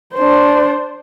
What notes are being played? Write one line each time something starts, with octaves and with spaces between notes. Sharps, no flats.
D4 C5